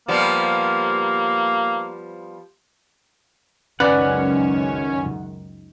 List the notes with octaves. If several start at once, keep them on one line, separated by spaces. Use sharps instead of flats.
F3 G3 A#3 B3
C#2 F#2 D#3 C#4 B4 D5 F#5